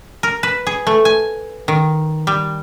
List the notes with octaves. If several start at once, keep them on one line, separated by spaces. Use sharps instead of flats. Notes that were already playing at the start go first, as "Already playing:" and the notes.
A#4
B4
G#4
A3
G#5
D#3
G3